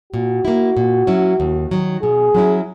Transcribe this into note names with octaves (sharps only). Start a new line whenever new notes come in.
A#2 F#4
A#3 E4
A#2
F#3 C#4 E4
D#2
D#3 F#3
B2 G#4
F#3 C#4 E4